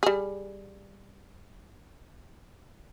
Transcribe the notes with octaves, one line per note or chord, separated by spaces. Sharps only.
G3 G#4